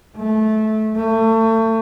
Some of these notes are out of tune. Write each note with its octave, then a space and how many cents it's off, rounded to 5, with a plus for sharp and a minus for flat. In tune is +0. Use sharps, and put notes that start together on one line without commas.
A3 -20
A3 +30